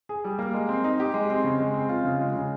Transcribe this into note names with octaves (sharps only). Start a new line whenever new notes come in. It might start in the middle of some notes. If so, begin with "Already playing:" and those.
G#4
G3
A#3
G#3
C4
D#4
G4
G#3
C4
C#3
G#3
C4
F4
C#3
G#3
C#3